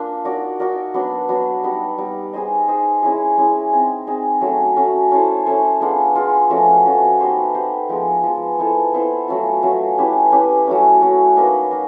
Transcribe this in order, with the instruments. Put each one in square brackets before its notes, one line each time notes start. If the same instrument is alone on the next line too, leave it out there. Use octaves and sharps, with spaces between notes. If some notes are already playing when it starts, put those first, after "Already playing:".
Already playing: [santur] A#3 D4 F4 F5
D#4 F#4 A#4 D5
D#4 F#4 A#4 D5
F#3 B3 D4
F#3 B3 D4
G3 B3 D#4
G3 B3 D#4
D#4 G#4 C5 D#5
D#4 G#4 C5 D#5
G#3 C#4 E4 G#4
G#3 C#4 E4 G#4
C4 D#4 G#4
C4 D#4 G#4
F#3 A3 C#4
F#3 A3 C#4
C#4 E4 A4 C5
C#4 E4 A4 C5
G#3 B3 D4 F4
G#3 B3 D4 F4
F3 A3 C#4 F#4
F3 A3 C#4 F#4
B3 D#4 G4 C5
B3 D#4 G4 C5
F3 G#3 B3
F3 G#3 B3
B3 E4 A4 C5
B3 E4 A4 C5
F#3 A3 C#4 F4
F#3 A3 C#4 F4
C#4 E4 G4 B4
C#4 E4 G4 B4
F#3 A3 C#4
F#3 A3 C#4
A#3 D#4 F#4 B4
A#3 D#4